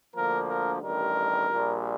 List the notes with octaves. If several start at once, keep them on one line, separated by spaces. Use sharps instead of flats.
D2 D3 F3 A#3 A#4
A#4
A1 G2 D#3 G3 A#4
A#1 A#2 G3